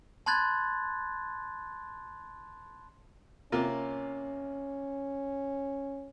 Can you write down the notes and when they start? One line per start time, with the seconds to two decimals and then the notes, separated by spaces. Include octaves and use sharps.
0.26 A5 B5 C6 F#6 G#6 A6
3.52 C3 A#3 C#4 F4